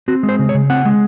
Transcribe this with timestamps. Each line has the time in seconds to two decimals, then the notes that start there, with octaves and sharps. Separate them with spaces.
0.08 C4 F#4
0.23 G#3
0.29 C5
0.39 C#3
0.49 C#5
0.54 C#3
0.70 C4 F#5
0.85 G#3